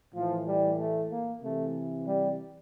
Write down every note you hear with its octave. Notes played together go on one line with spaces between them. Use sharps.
A2 E3 F3
G3
A3
A#3
C3 E3 A3
G3